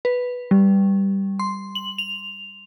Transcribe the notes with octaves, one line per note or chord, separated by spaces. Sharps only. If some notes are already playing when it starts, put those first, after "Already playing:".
B4
G3
C6
F#7
F7